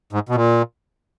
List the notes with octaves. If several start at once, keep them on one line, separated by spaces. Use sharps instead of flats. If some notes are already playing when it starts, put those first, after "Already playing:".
G#2
B2
A#2